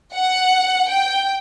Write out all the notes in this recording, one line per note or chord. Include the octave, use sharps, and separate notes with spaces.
F#5
G5